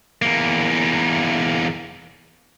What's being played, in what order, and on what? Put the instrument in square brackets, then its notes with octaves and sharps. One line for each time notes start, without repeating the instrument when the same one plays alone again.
[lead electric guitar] E2 A#3